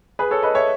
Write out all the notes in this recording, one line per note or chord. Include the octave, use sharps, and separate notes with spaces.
G#4 B4
A4 C#5
B4 D#5
C#5 E5